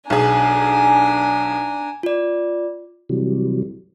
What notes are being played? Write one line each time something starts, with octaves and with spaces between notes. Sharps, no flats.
B1 D4 G#4 G#5 A#5
F4 D5
C3 E3 F#3 G3